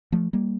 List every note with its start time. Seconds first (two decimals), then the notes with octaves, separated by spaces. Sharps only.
0.12 F3 A3
0.33 G3 A#3